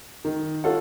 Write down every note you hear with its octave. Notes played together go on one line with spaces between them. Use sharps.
D#3
F4 A4 C#5 F#5